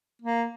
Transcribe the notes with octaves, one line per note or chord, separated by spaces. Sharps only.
A#3